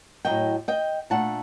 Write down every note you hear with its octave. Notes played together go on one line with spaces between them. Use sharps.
A2 F#3 A3 D#5 G5
D#5 G5
A#2 A3 D4 F#5 A5